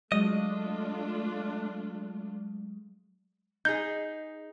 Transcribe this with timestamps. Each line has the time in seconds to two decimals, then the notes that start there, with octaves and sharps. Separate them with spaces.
0.12 F#3 G#3 A3 D4 F4 D#5
3.65 D#4 G#4 G6